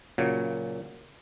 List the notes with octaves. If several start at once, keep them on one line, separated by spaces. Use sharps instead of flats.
A#2 C#3 F#3